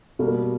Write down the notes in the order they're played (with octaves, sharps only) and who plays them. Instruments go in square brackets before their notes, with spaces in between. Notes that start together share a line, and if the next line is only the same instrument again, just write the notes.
[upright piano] B2 G3 A#3